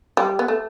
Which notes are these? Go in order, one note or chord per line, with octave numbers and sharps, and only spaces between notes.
G3
B3
A3